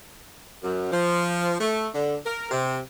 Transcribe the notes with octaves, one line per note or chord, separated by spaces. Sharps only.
F#2
F3
A3
D3
A#4
C3